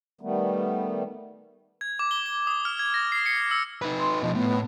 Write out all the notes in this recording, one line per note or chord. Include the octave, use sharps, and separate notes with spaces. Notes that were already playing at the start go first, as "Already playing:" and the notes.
D#3 G3 A3 B3
G#6
D6
G7
G7
D#6
F6
G#6
A#6
C7
C#7
E6
D#4 B4
C6
B2 F3 D#5
A2 B3